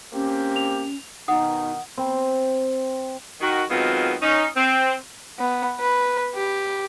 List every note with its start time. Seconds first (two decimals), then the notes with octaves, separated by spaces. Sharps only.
0.13 A#3 C4 C#4 G4
0.56 F7
1.28 B2 D#3 D#4 F#5 D#6
1.98 C4
3.41 D#3 F#4
3.70 D#3 F#3 G#3 B3 C4 F4
4.22 C#4 D#4
4.57 C4
5.39 B3
5.80 B4
6.35 G4